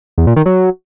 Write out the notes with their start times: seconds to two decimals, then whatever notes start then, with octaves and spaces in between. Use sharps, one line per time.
0.18 E2
0.27 A#2
0.36 D#3
0.46 F#3